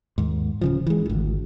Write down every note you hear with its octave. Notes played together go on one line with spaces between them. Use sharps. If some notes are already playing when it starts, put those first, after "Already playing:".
D#2 G#2
D1 C#3 F3
E3 G#3
G#1 D2